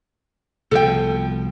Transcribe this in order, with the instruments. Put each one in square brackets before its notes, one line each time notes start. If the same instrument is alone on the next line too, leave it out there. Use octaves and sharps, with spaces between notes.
[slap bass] C2 B2 F3 [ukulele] A4 G5